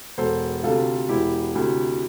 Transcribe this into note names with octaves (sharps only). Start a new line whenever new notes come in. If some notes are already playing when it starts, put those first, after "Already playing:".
E1 A4 C5
D2 C3 F4 A4
E1 E4 G4
D2 C3